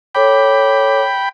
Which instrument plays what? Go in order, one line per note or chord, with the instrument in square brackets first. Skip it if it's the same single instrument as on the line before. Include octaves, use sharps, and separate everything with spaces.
[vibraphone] A4 C#5 D6 [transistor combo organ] G5 B5